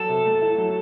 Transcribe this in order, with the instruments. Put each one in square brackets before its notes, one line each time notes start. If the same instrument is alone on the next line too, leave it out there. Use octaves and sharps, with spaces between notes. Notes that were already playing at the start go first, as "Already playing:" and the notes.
Already playing: [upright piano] F#3 [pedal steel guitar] A4
[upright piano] C3
A3
E4
F#3